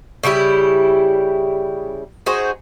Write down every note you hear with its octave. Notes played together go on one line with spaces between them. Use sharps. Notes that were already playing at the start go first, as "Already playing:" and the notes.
C#3 G3 E4 G4
D#4 F#4 G#4 C5